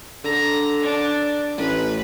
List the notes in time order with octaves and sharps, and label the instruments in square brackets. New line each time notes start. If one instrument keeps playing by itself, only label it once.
[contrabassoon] D3 [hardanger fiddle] A#5
[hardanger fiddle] D4
[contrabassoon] A1 [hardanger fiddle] B4